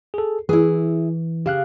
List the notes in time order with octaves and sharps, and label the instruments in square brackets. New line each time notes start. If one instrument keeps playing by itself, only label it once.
[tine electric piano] G#4 A4
[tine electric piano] E3 [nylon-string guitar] E4 G#4
[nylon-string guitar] C#3 [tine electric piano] G4 F5 F#6